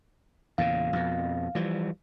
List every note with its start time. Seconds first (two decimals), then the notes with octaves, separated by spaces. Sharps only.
0.58 E2 A#2 C#3 F5
0.93 F2 B2
1.55 E3 F3 G3